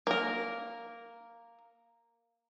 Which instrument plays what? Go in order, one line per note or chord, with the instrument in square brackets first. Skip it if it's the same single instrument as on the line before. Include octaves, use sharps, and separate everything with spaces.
[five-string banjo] A#3 A#4